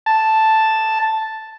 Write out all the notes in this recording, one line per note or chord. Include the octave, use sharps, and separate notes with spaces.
A5